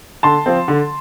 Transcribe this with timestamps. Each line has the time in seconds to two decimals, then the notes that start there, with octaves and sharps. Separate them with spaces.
0.23 D3 A5 C6
0.46 F3 C4
0.68 D3